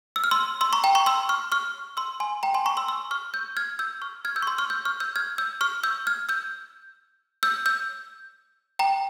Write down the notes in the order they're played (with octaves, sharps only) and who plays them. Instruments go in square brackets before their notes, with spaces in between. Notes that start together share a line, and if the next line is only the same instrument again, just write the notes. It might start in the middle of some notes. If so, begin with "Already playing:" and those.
[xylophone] E6
F6
C6 E6
C6 E6
A#5 C#6
G5 A#5
A#5 C#6
C6 E6
C#6 F6
C#6 F6
C6 E6
G#5 C6
G5 A#5
G#5 C6
A#5 C#6
C6 E6
C6 E6
C#6 F6
E6 G6
F6 G#6
E6 G6
C#6 F6
F6 G#6
E6 G6
C#6
C6 E6
C#6 F6
E6 G6
C#6 F6
E6 G6
F6 G#6
E6 G6
C#6 F6
E6 G6
F6 G#6
E6 G6
E6 G6
E6 G6
G5 A#5